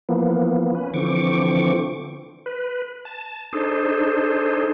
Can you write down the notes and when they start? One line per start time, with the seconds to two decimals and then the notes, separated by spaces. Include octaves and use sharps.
0.09 E3 F3 A#3 B3
0.75 C#4 B4
0.94 D3 E3 F3 C4 C#6 D6
2.46 B4
3.05 A5
3.53 D4 D#4 G#4 A4 C5